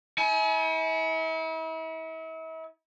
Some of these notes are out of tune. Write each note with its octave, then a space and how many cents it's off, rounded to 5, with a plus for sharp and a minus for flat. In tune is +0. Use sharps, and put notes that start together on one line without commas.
E4 -40 G#5 +35